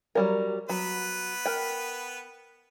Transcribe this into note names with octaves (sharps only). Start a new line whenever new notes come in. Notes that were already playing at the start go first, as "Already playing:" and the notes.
F#3 G3 A#4
F#3 B3 B4
A#4 G5